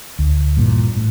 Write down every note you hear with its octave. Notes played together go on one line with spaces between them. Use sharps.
D2
G2 A#2 E3
A2